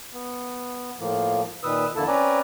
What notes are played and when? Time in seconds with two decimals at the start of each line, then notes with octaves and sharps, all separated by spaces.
0.13 B3
0.99 A2 F3 A#3
1.63 A#2 D#3 B4 D#6 E6
1.96 F2 D3 A#3 E4 A4 A5
2.07 C4 C#4 B4 D5 G#5 A#5